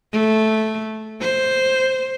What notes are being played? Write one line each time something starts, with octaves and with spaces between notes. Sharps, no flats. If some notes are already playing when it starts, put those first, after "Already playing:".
A3
C5